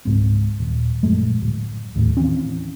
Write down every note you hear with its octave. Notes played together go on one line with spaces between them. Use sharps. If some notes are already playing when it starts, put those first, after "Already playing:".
C#2 G#2 C4
D#1
A#1 F#2 G#3 A3
D1
D#2 A2
D#3 E3 C4 C#4